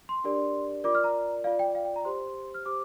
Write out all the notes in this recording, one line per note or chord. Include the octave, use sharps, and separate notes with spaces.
C6
D4 G4 A#4 D5
F4 A#4 D5 D6
F6
A#5
F4 D5 F5
G5
F5
G5
A#5
G4 C5 C6
F6
G4 C5 D6